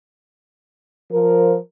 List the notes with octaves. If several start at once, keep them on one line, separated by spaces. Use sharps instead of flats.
F3 A#4